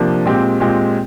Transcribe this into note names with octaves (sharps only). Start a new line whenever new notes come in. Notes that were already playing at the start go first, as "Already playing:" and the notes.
Already playing: C3 F3 A#3 D4
A#2 G#3 C4 G4
A#2 G#3 C4 G4